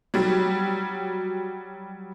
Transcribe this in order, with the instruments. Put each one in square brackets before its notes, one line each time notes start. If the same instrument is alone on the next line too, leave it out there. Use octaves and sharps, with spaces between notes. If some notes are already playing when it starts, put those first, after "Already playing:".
[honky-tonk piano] F#3 G3